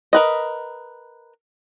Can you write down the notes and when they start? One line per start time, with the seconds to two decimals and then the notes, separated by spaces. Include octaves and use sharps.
0.13 A#4 B4 D#5